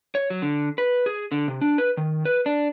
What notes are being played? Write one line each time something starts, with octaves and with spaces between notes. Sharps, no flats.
C#5
F#3
D3
B4
G#4
D3
C3
D4
B4
D#3
B4
D4